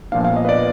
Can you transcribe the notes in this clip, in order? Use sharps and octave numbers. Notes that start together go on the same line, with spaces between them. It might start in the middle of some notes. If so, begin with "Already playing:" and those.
A#2 F3 B3 D4 F5
F5
D#5
B4
D5